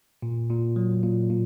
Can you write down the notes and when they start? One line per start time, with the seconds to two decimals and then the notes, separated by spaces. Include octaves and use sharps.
0.22 A#2
0.50 A#2
0.76 F#3
1.03 A#2
1.30 A#2